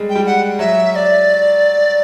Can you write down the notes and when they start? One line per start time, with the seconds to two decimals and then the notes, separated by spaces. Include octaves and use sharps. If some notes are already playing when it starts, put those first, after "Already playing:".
Already playing: G3 G#3
0.09 G5
0.15 G3
0.26 F#5
0.59 F#3 E5
0.92 E5
0.95 D5